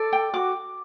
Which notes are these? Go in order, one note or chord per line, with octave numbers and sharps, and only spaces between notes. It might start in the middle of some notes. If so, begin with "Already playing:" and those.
Already playing: A4 D5
G5
F#4 D6